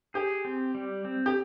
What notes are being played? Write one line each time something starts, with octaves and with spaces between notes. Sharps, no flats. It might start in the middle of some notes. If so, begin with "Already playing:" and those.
G4 G#4
C4
G3
C4
G4